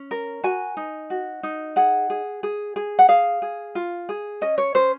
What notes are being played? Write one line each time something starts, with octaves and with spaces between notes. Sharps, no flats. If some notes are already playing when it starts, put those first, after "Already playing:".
Already playing: C#4
A#4
F#4 G#5
D#4
F#4
D#4
G#4 F#5
G#4
G#4
G#4
F#5
G#4 F5
G#4
F4
G#4
C#4 D#5
C#5
C#4 C5